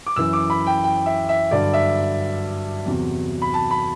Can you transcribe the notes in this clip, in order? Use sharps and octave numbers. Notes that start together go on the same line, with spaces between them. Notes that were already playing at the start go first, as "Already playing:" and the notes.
D6
F#2 E3 E6
D6
B5
G5
G5
E5
E5
G2 D3 F#3 D5
E5
E2 C3 F#3
B5
A5
B5